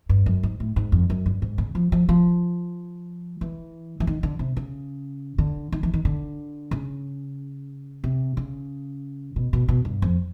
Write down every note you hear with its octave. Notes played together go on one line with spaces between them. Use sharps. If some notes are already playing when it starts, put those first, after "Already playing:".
G2
F#2
G#2
A2
G#2
F2
F#2
G2
G#2
C#3
F3
F3
F3
E3
E3
D#3
D3
C3
C#3
D3
D#3
E3
D#3
D3
C#3
C3
C#3
B2
B2
B2
G2
F2